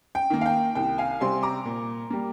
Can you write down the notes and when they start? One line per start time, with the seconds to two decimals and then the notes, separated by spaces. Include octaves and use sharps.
0.15 G5
0.30 D#3 A#3
0.41 F5
0.46 G5
0.75 C2 G5
0.98 F5 G#5
1.20 C3 G3 C4 G#5 C6
1.43 A#5 D6
1.65 A#2
2.10 G3 A#3